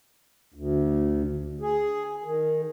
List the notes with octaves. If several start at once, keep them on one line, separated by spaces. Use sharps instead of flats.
D2
G#4
D#3